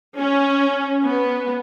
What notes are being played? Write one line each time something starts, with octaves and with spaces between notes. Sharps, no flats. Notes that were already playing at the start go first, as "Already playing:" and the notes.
C#4
B3